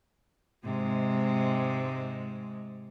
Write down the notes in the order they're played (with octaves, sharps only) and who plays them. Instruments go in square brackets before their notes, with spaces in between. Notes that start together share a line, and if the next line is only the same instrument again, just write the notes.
[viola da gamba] G#2 C3 G#3